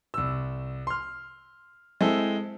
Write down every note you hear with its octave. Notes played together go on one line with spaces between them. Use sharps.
C2 E6
C6 F6
G#3 C4 E4 A4